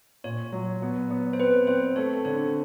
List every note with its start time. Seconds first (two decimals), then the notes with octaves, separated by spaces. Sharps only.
0.24 A#2 C#5
0.52 F#3
0.82 B3
1.10 B3
1.33 C5
1.39 C4 B4
1.67 C4 C5
1.96 A3 C#5
2.25 D3 C#5